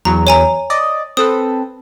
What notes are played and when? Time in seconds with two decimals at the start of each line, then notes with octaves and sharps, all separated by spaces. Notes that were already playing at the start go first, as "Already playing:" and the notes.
0.05 E2 F#3 A#5
0.27 C#5 G#5 A#5
0.70 D5 D#5
1.17 C4 A4 B4 D#6